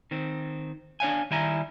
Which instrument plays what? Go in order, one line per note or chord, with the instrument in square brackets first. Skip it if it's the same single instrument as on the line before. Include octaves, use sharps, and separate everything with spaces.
[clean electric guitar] D#3 C4
D4 C#5 F5 G#5
D#3 G3 E4 G#5 A#5